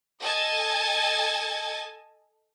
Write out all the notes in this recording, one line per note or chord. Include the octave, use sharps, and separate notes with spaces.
A4 D#5 G#5 A5 G#6 A6